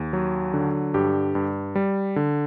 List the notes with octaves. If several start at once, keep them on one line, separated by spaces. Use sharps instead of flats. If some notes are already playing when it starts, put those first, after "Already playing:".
Already playing: D#2
F#3
D3
G2 G4
G2
G3
D3